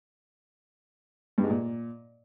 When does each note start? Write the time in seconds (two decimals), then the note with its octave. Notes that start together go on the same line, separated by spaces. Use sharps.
1.38 G2
1.44 G#2
1.50 A#2